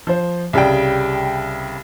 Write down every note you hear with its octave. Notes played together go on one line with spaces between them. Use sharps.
F3 C5
C2 C#3 G3 G5